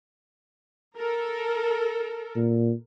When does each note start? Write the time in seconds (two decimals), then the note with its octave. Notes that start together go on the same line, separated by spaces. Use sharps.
0.96 A4 A#4
2.36 A#2